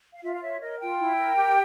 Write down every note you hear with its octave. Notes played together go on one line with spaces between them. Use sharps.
F5
F4 E5
F5
C#5 E5
A#4 D#5
F4 G5
E4
A#4
G4